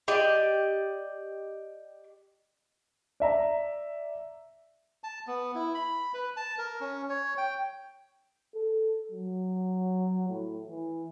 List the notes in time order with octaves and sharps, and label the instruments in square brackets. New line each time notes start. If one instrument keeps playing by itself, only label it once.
[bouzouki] G4 D5 D#5
[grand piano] D5 E5 A#5
[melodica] A5
B3
E4
B5
B4
A5
A#4
C#4
C#5
G5
[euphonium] A4
F#3
A2
E3